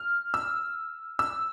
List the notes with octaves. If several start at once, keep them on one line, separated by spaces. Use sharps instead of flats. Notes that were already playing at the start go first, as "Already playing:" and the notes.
Already playing: F6
E6
E6